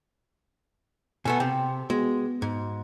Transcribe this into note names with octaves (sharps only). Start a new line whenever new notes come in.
B2 A3 B3 G#5
C3 G5
G#3 B3 F#4
G#2